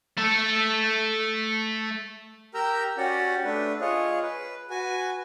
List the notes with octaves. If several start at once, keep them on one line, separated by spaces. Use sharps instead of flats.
A3 A4
G4 A#4 G5 A#5 E6
C#4 F#4 G4 D5 F#5
A3 D4 B4
F4 G#4 C#5 D#5
B4
F#4 B4 G#5